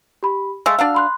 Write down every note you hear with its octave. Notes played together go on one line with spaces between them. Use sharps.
G4 B5
G#3 A3 F5 E6
D4 F#4 F5
B5 C6 F#6